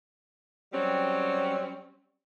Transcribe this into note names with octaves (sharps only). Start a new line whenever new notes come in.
F#3 G3 C4 C#4 G4